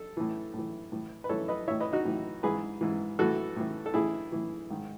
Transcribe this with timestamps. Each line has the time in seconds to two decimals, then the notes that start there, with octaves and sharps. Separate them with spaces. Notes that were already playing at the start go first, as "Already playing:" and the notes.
Already playing: A4
0.17 A2 E3
0.54 A2 E3
0.92 A2 E3
1.24 B4
1.29 A2 E3 A4 C#5
1.48 B4 D#5
1.67 A2 E3 C#5 E5
1.81 B4 D#5
1.93 D#4 F#4
2.05 A2 E3
2.43 G#2 E3 G#4 B4
2.81 G#2 E3
3.19 A2 E3 F#4 A4
3.56 A2 E3
3.86 A4
3.94 A2 E3 E4 G#4
4.32 A2 E3
4.70 G#2 D#3